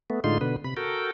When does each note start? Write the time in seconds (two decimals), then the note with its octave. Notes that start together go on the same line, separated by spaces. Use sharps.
0.10 A3 B3
0.24 A2 D3 G#3 D#4 F4 C6
0.41 B2 D3 B4
0.64 C3 B5
0.77 F#4 A4 A#4 G5